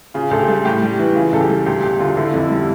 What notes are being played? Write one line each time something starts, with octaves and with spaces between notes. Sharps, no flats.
C#3 F4
D2 A4
G4
G3
A2 G4
G3
E3
C#3 F4
C#2 A4
G4
G3
D2 G4
E1 G4
D3 F4
D3 E4
F4
F2 E4
G3
E4